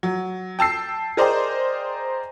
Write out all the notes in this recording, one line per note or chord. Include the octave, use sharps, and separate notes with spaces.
F#3
G5 A5 E6 C7
G#4 A#4 C5 D5 D#5 G5